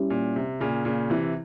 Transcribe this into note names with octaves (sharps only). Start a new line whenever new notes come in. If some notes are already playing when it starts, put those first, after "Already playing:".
Already playing: G3 C#4 E4 G4
A#2
C3
A#2 C#3
A#2 C#3
C3 E3